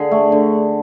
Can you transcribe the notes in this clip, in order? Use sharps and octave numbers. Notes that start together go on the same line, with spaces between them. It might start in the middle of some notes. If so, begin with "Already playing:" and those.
Already playing: D3 G#4
A3
D3